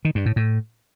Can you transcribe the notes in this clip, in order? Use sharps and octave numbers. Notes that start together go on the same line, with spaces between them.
D#3
G2
A2
A2